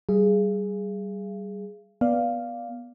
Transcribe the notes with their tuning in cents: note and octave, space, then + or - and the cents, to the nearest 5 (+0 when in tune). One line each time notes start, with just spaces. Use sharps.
G3 -20 G#4 +0 F5 -45
B3 -10 D5 +0 F5 +0